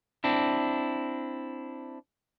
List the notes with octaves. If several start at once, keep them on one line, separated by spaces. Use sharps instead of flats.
C4 D4 E4